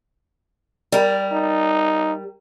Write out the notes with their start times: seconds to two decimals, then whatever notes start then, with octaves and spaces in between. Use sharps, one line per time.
0.92 G3 A#4
1.32 D#4